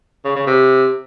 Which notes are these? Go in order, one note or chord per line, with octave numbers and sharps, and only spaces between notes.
C#3
C#3
C3